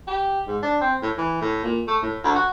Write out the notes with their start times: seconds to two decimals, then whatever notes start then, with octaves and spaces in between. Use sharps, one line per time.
0.07 G4
0.47 G#2
0.62 D4
0.81 C4
1.02 A2
1.18 E3
1.41 A2
1.64 A#2
1.87 A3
2.02 A2
2.24 D2
2.35 F#4